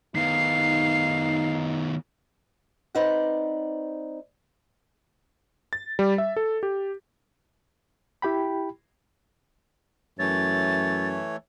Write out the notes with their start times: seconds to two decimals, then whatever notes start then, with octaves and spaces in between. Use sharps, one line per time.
0.15 D#3 B3 D#4 F5 C7
2.95 C4 D#4 B4 D5 F#5
5.73 A6
5.99 G3
6.18 E5
6.36 A4
6.63 G4
8.22 E4 G4 G5 B5
10.19 F#2 E3 A3 C#5 A6